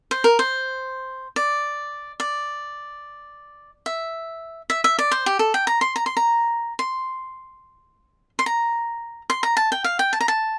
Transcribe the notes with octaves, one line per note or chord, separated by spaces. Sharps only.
C5
A#4
C5
D5
D5
E5
E5
E5
D5
C5
G4
A4
G5
A#5
C6
A#5
C6
A#5
C6
C6
A#5
C6
A#5
A5
G5
F5
G5
A5
A#5
A5